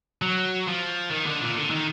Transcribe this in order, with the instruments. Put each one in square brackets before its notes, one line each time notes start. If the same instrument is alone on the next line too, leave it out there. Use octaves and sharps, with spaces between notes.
[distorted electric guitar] F#3
F3
D#3
D3
A#2
D3
D#3